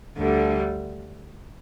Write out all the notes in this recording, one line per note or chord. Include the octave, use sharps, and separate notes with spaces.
D2 D3 G3